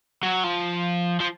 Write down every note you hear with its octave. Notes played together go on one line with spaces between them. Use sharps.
F#3
F3
F3